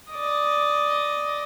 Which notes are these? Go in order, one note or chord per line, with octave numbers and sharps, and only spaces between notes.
D5 D#5